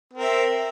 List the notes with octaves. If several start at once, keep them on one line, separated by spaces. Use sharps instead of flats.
C4 A#4 E5